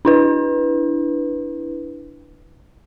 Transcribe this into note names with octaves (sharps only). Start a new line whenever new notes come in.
D4 E4 B4